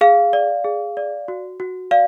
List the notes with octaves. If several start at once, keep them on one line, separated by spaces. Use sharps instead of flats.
G#4 F5
D5
G#4
D5
F#4
F#4
D5 F5